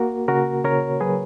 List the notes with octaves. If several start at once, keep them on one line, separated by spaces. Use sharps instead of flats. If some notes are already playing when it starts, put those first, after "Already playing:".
Already playing: A#3 F#4 A#4
C#3 F#4 A#4
C#3 A#4 C#5
F#3 G#4 B4